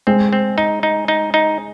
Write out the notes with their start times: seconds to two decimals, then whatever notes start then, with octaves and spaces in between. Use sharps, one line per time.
0.07 G#3 C4
0.33 C4
0.58 D#4
0.83 D#4
1.08 D#4
1.34 D#4